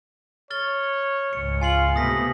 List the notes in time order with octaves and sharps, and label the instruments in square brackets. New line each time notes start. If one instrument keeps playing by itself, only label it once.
[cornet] C#5 [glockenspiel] F6 A6 G7
[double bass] C#2 G#2 [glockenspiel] C#7
[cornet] F4 [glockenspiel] G#5 C7 F#7
[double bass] C3 B3 [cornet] A3 [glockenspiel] D#6 A#6 B6